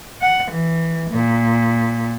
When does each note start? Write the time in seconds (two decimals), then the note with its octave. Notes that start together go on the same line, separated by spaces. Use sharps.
0.21 F#5
0.51 E3
1.11 A#2